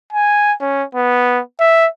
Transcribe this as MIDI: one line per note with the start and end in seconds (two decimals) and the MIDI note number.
0.13 0.54 80
0.61 0.84 61
0.95 1.41 59
1.60 1.87 76